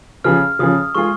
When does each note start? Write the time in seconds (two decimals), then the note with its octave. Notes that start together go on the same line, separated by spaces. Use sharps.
0.24 C#3 F3 C#4 G#4 F6
0.59 C#3 F3 C#4 G#4 D#6
0.95 G#3 F4 G#4 C#6